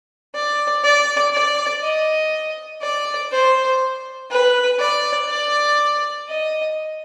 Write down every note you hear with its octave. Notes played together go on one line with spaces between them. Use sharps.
D5
D5
D5
D#5
D5
C5
B4
D5
D5
D#5